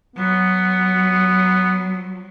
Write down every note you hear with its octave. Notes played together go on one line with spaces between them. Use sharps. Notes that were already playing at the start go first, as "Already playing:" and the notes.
F#3 B3